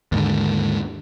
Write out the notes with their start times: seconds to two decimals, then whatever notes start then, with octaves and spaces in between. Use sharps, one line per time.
0.12 D#2 G#2 D3